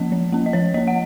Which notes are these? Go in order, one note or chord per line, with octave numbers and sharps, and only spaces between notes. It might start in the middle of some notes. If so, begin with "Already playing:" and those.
Already playing: F3 A#3 C#4 D#5
F3
A#3 C#4
D#5
F3 C#5
A#3 C#4 D#5
F#5